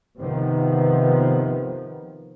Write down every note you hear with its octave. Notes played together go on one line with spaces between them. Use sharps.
C3 D#3 F3 B3